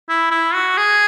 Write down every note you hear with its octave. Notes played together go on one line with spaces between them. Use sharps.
E4
E4
F#4
G#4